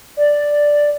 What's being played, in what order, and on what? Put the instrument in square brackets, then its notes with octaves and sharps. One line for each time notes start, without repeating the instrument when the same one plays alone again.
[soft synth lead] D5